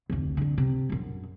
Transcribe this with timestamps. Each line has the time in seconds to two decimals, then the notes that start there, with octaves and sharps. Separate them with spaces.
0.10 F1 D2
0.37 F2 D3
0.58 C3
0.90 A#1 F#2